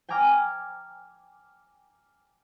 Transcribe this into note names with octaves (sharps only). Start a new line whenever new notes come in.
G5 G#5 A#5 D6 F6 G#6